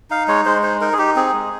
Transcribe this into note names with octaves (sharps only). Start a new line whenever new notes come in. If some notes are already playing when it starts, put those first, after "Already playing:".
D#4 F5
G#3 C#5
G#3 C5
D#4 C5
D#4 A#4
G#4
D#4 G4
C4 G#4
G#3